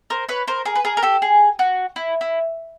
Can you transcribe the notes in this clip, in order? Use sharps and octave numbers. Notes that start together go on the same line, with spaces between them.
A#4 C5
B4 C#5
A#4 C5
G#4 A#4
B4
G#4 A#4
A#4
G4 A4
G#4
F#4
E4
E4